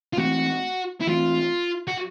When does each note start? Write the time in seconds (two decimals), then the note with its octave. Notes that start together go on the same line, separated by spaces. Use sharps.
0.13 F4
0.17 E3 A3 C4 F#4
1.01 E4
1.07 E3 A3 C4 F4
1.88 F#4